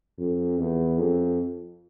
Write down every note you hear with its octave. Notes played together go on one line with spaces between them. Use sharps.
F2
E2
F2